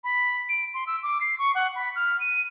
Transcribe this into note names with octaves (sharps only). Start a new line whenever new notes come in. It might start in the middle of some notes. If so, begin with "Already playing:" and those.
B5
D7
C6
E6
D6
C7
C#6
F#5
B5
F6
D#7